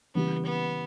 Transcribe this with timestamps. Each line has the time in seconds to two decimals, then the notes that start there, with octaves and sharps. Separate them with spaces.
0.15 C#3 E3 G3 B3
0.46 B3